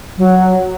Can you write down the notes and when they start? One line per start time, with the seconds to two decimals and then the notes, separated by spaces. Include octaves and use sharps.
0.18 F#3